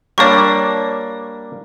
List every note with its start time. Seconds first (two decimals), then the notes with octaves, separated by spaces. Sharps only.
0.18 G3 A#3 D4 C#5 C#6